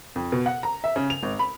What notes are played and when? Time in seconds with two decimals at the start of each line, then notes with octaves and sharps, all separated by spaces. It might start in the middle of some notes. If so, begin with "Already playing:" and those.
0.16 F2
0.32 B2
0.46 F#5
0.63 A#5
0.84 E5
0.96 C#3
1.10 F7
1.23 G#1
1.39 B5